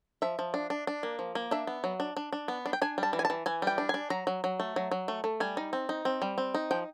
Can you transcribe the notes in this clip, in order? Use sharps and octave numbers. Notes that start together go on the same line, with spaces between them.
F3 E5
F3
D4
D4
D4
A#3
F3
A#3
D4 E5
B3
F#3
D4
D4
D4
B3
D4
G5
D4 G#5
G3
A5
E3
G#5
A5
E3
E3 G#5
G3 G5
D4
D4 G#5
F#3 A#5
F#3
F#3
A3
F#3
F#3
A3
A3
G3 G#5
D#4
C4
D#4
C4
G3
C4
D#4
F3 G5